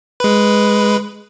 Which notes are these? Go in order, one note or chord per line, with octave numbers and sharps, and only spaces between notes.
G#3 B4